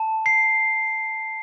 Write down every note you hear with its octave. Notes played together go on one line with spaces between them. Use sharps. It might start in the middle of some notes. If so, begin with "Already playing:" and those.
Already playing: A5
C7